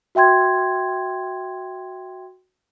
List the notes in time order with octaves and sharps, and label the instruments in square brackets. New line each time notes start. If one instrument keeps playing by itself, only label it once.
[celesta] F#4 E5 G5 C6 G#6